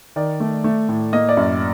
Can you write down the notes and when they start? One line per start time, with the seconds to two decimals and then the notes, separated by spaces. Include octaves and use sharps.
0.16 D#3 D5
0.40 A3
0.64 A3
0.89 A2
1.13 A#3 D#5
1.29 D5
1.37 F#2